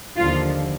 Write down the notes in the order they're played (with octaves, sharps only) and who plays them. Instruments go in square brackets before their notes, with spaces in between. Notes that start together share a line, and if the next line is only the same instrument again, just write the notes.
[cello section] D#2 D3 F3 F4